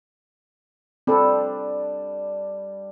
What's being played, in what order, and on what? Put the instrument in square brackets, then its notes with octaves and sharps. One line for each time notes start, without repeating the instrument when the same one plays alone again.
[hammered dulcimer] G3 D4 [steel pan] C4 A4